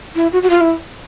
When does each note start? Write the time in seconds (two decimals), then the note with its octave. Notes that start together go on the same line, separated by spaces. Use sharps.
0.15 E4
0.32 F#4
0.43 F#4
0.50 F4
0.61 E4